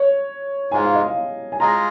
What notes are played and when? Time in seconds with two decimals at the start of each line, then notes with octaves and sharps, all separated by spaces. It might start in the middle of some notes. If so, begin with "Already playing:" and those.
Already playing: C#5
0.71 G#2 G#3 F4 G#5
0.84 F5
0.95 D#5
1.08 F5
1.52 G#5
1.60 G#3 F4 G#4 D#5 A#5